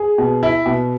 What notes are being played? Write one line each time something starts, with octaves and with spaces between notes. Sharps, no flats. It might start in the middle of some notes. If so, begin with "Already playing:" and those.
Already playing: G#4
B2
E4
B2